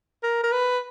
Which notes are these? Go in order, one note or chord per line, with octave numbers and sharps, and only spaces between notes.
A#4
A#4
B4